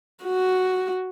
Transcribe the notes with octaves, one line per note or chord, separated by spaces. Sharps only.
F#4